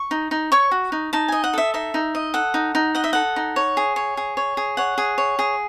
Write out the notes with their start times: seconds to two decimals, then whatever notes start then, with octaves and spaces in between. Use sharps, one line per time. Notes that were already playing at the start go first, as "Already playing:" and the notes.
Already playing: C#6
0.11 D#4
0.31 D#4
0.52 C#5 C#6
0.71 F#4
0.92 D#4
1.13 D#4 A5
1.28 D#5 G#5
1.44 F#5
1.54 A4 E5
1.74 D#4 E5
1.94 D#4
2.15 D#5
2.34 A4 F#5
2.54 D#4
2.75 D#4
2.95 D#5 F#5
3.04 E5
3.13 A4 F#5
3.36 D#4
3.56 C#5
3.77 G#4
3.96 C#5
4.17 G#4
4.37 C#5
4.57 G#4
4.77 C#5 F#5
4.98 G#4
5.18 C#5
5.39 G#4